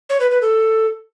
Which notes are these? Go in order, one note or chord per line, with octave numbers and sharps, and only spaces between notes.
C#5
B4
B4
A4